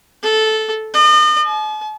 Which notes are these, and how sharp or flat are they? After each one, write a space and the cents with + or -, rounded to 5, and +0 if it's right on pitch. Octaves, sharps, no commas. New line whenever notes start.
A4 -10
D#5 -40
A5 -45